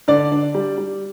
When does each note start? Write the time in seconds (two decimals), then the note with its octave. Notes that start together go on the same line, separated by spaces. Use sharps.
0.08 D3 D5
0.32 D4
0.55 G3
0.78 G3